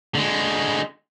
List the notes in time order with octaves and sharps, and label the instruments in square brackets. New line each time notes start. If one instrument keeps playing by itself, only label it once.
[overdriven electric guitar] D3 G#3